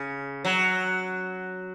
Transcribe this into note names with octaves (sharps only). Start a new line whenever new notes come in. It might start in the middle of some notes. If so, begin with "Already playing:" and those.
Already playing: C#3
F#3